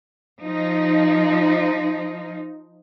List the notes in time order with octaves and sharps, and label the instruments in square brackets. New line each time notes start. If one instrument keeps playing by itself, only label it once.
[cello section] F3 D#4